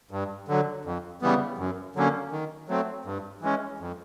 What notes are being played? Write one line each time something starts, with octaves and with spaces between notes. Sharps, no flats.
G2
D3 F#3
F2
C#3 E3 G3 B3
F#2
D3 F#3 A#3 C#4
D#3
F#3 A3 C4
G2
E3 G#3 C#4
F2